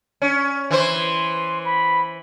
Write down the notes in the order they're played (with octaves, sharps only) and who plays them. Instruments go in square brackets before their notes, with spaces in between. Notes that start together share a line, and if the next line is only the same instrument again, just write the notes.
[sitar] C#4
[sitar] E3 E4 C5 [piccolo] C6
[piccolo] B5